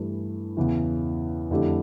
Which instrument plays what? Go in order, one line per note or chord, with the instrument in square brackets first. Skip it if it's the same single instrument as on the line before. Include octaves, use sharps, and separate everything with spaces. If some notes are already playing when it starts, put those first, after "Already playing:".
Already playing: [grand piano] G2 E3 A3
E2 C#3 E3
F2 D3 A3 E4 G4